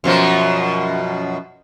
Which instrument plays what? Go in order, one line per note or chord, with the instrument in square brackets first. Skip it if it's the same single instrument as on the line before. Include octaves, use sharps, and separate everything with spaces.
[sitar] F#2 B2 F3